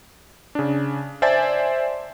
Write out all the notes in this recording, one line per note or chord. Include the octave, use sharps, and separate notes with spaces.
C#3 D4
C5 D5 E5 G#5 A5 A6